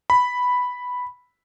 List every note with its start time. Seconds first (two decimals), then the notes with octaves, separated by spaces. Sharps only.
0.10 B5